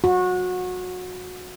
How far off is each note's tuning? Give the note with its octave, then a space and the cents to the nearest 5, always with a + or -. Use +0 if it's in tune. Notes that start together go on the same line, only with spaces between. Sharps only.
F#4 -25